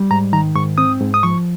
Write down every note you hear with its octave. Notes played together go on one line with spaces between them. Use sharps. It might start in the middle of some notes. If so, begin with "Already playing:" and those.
Already playing: G3
G#2 A#5
D#3 A#5
G#2 C#6
C4 D#6
G#2
D#6
F3 C#6